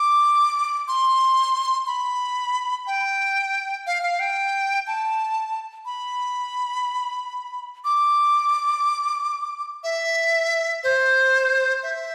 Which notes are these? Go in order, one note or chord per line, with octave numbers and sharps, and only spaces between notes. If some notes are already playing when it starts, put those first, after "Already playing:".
Already playing: D6
C6
B5
G5
F5
F5
G5
A5
B5
D6
E5
C5
E5